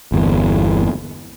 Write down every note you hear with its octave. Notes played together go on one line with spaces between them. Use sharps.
G1 E2